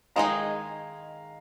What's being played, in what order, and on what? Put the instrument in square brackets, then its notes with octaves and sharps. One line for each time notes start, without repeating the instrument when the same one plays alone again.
[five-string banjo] D#3 G#3 D#4 G#4 [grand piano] F5 A#5